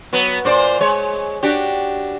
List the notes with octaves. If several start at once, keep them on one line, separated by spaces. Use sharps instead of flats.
F#3 B3
A#2 C5 D5
G#3 C#5
D4 F#4 G4